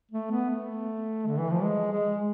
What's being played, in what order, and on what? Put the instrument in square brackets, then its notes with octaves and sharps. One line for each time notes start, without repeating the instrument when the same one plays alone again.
[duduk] A3
B3
A3
D3
E3
F3
G#3
G#3